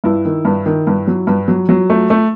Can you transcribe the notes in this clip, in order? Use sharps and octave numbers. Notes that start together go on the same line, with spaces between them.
G2 E4
D#3
G2
D#3
G2
F#3
G2
F#3
F#3
A3
A3